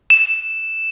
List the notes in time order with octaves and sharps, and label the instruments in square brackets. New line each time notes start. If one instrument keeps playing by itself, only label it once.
[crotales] E7